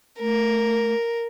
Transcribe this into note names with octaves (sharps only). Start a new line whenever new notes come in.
A3 A#4